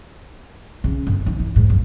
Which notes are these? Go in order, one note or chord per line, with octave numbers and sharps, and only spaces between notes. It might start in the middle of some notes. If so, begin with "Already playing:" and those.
C#3
G1
D#3
E3
G#2
G2